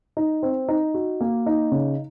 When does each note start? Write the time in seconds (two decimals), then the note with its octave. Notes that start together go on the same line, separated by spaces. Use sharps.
0.17 D#4
0.43 C4
0.68 D#4
0.94 F#4
1.21 A#3
1.46 D#4
1.72 C#3